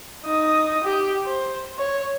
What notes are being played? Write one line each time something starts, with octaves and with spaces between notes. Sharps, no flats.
D#4 D#6
G4
C5
C#5